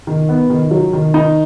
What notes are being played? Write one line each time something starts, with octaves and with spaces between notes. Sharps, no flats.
D#3
B3
D#3
F#3
D#3
D#4